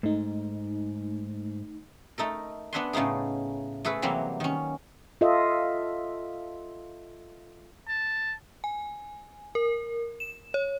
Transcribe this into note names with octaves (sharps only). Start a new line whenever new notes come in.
G#2 A3 D#4
A3 D#4 A4 A#4
B3 D4 E5 F#5 G#5 C6
A2 C#3 A3 D#4 G#4
A3 G#4 A4 B4
C3 E3 F#3 G3 A#3
D#3 C#4
F4 A4 D#5 E5
A5
G#5
A#4
E7
C#5